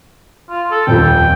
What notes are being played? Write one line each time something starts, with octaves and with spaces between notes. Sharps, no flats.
F4
A4
D#1 F2 G5